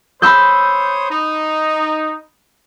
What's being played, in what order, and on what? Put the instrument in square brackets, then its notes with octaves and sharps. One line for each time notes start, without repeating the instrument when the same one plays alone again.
[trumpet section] C5 C#5 D#6 [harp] B5 E6 G6
[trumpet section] D#4